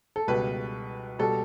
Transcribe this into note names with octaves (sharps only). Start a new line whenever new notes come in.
A4
C#2 B2 G3 B4
B2 G3 A4